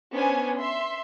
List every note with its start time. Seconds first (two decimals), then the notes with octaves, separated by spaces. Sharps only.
0.14 B3 C#4 D4 C5 G#5
0.58 E5 C6